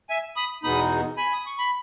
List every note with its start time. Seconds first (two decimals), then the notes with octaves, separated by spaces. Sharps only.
0.10 E5 G#5
0.36 B5 D#6
0.63 E2 B2 G#3 B3 D#4 B5 D#6
1.17 G#5 B5
1.33 D#6
1.46 C#6
1.59 B5